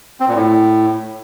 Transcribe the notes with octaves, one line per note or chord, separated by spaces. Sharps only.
C4
A#2
A2